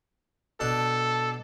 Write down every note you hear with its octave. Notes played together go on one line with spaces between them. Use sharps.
B2 D4 A4 C6